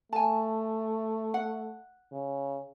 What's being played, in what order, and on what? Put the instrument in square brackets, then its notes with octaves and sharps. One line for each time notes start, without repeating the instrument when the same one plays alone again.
[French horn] A3 [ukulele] G#5 A5
[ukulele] F#5
[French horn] C#3